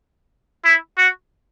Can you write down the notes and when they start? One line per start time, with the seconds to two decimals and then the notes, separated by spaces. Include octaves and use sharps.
0.65 E4
0.97 F#4